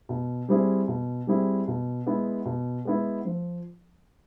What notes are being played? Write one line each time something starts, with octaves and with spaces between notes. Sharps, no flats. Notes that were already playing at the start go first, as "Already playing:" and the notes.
B2
G3 C4 E4 G#4
B2
G3 C4 E4 G#4
B2
G#3 B3 E4
B2
G#3 B3 E4
F3